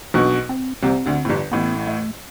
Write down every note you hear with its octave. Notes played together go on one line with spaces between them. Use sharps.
B1 B2 D4
C4
C2 C3 C4
D2 D3
A2
G1 G2
A1 A2 B3
A3